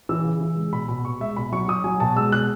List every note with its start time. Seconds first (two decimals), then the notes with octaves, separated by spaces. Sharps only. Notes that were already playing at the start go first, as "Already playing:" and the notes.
0.09 E3 E6
0.24 C#3
0.41 E3
0.56 G#3
0.72 B2 B5
0.88 B2 B5
1.05 B2 C#6
1.20 G#3 E5
1.36 B2 B5
1.52 F#3 C#6
1.68 F#3 D#6
1.84 F#3 G#5
2.00 B2 A5
2.16 G#3 E6
2.32 B2 F#6